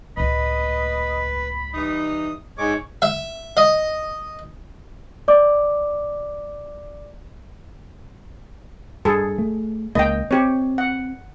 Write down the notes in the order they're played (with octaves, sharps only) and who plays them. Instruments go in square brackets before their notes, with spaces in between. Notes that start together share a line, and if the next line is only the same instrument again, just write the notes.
[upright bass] C#2 A2 [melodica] B4 [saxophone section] D#5 [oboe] B5
[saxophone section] E3 G3 D#4 [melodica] D#6
[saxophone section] G#2 [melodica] G#3 D6 [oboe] C#5
[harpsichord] E5
D#5
[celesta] D5 D6
[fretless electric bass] G2 [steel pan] G#4 A4
[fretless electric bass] A3
[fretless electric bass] C#2 A#3 [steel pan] D#5 G5
[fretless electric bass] C4 [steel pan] G4 C#5
[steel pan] F#5